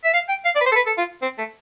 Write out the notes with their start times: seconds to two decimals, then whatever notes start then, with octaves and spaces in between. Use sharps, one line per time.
0.04 E5
0.14 F5
0.28 G5
0.45 F5
0.55 D5
0.61 B4
0.66 C5
0.72 A4
0.76 B4
0.86 A4
0.97 F4
1.22 C4
1.38 A3